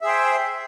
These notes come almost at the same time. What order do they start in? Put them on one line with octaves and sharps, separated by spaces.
E5 G#4 C5 G5